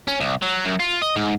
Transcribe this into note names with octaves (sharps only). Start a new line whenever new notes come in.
C#4
C2
F#3
F#2
F4
D#5
G#2